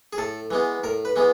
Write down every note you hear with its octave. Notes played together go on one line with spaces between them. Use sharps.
G#4
A2 A4
E3 G#3 B3
A2 A#4
B4
E3 G#3 B3